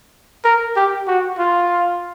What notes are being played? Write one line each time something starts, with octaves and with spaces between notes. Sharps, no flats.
A#4
G4
F#4
F4